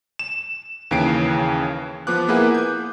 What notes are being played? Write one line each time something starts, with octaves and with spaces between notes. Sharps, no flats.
E7
D#2 C#3 E3 C7 D7
F3 B3 D6 F#6
A#3 E4 G#4 B4 F#5
G6